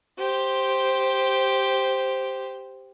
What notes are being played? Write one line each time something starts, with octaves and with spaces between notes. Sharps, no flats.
G4 C5